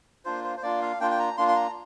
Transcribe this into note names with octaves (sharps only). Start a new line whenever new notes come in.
A#3 D4 F4 C5
C5
C5
A#3 D4 F4 D5
F5
A#3 D4 F4 G5
G5
A#5
A#3 D4 F4 C6
C6
A#5